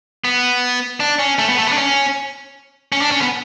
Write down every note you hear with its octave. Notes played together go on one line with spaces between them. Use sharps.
B3
D4
C#4
A3
B3
A3
B3
D4
C#4
C#4
D4
C#4
B3